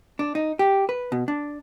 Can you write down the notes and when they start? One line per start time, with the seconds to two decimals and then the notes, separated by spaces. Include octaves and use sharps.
0.19 D4
0.35 D#4
0.59 G4
0.89 B4
1.12 B2
1.28 D4